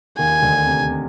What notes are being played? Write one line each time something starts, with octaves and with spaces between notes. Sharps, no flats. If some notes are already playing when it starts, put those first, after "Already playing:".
D#2 D#3 G#5
D2 D3
C3
C3